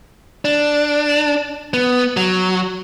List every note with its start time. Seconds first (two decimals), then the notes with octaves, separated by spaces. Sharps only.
0.45 D4
1.74 B3
2.17 F#3